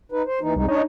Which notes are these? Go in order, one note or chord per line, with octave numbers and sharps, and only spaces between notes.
D#4 B4
C5
D#2 E3 D#4
C2 G#3 D#4
D4 D#4 C#5